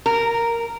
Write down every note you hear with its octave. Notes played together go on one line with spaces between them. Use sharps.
A#4